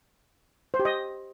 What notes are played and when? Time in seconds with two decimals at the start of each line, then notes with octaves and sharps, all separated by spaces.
0.74 C5
0.80 G4
0.85 D#5